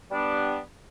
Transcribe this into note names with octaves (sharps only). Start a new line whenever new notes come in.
G3 B3 D4